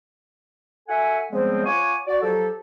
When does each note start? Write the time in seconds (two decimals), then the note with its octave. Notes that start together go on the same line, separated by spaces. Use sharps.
0.88 F#4 A4 E5 F#5 G#5
1.31 C#3 F3 G3 G#3 B3 C4
1.66 F4 C#5 F#5 G#5 C#6 D6
2.07 F#4 D5
2.22 F3 F#3 G4 A4